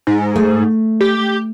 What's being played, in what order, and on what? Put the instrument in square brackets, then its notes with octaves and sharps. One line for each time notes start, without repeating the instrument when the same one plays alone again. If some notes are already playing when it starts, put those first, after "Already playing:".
[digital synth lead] G#2
[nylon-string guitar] A3
[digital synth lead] G4